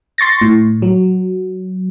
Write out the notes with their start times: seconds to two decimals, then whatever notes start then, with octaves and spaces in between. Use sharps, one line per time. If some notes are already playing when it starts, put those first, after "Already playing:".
0.18 C6 C#6 A6 A#6
0.41 A2
0.82 F#3